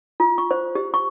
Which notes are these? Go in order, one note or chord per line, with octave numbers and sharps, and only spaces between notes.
F4
C#6
C5
G4
C#6